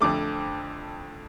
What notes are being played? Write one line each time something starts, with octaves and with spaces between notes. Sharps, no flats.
F2 D3 A3 D6